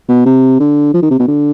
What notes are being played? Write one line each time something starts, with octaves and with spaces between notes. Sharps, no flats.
B2
C3
D3
F3
D#3
C3
B2
D3